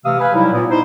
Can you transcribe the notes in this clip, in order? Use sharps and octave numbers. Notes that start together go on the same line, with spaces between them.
C3 E3 A3 F5 D#6 E6
B4 F5 G#5
F#3 G3 D#4 E4
A#2 B3
D#4 E4 C5